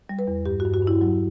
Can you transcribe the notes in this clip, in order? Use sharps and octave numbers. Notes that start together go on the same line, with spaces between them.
G3
B4
E2
G2 G4
F#4
G2
F#4
G2 E4
F#3